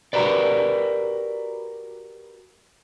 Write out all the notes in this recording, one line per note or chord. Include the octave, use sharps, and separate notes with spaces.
F#4 G4 A#4 B4 D5